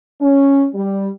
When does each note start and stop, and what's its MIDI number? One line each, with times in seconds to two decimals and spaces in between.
0.22 0.68 61
0.74 1.09 55